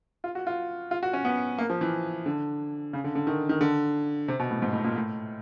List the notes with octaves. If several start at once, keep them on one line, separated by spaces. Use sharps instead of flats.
F4
F#4
F4
F4
F#4
C#4
B3
A#3
F3
E3
D3
C#3
D3
D3
D#3
D#3
D3
C3
B2
A2
G#2
A2
A#2
A2